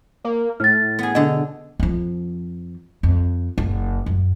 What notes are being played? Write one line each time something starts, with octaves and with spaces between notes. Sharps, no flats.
A#3
A2 F6 A6
B3 G#4
B2 D3 D#5
F2 F3
F2
F#1
F#2